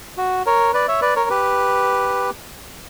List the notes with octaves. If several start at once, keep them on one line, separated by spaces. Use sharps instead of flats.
F#4
A#4 C#5
B4 D5
C#5 E5
B4 D5
A#4 C#5
G4 B4